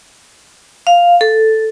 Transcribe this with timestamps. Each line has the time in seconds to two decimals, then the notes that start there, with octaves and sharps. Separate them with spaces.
0.87 F5
1.21 A4